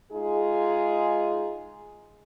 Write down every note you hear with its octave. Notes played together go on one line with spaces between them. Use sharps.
G#3 D#4 F4 G#4